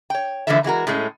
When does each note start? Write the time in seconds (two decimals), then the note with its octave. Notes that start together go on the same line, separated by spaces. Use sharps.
0.10 C#5 G5
0.47 D3 E3 F3 G#3 A3 E5
0.64 E3 G#3 F#4 A#4
0.87 A2 G#3 A3 C#4